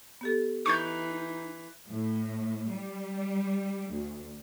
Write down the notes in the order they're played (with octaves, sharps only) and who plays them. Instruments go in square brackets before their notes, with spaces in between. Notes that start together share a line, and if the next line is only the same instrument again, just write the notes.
[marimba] B3 G4 A4
[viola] E3 [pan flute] D#4 [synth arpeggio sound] C#6 G6
[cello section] A2
G3
D2